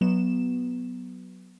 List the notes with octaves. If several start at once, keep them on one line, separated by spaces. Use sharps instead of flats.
F#3 B3 E7